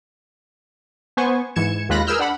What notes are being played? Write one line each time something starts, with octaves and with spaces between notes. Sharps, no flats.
B3 C5 G#5 C#6
G#2 E3 G#6 C#7 E7
D#2 G#3 F4 B5 F#6 A#6
G#4 A#4 B4 E6 F6 G6
D4 F#5 B5